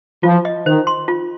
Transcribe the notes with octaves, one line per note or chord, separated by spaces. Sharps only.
F3 F4
D#5
D#3 C5
C6
F4